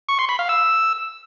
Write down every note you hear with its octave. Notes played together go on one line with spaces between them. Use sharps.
C#6
C6
B5
F5
E6